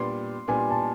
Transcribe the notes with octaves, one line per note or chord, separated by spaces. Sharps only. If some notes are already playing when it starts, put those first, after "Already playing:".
Already playing: A#2 G3 B3 D4 C6
A#2 G3 B3 D4 G#5
A5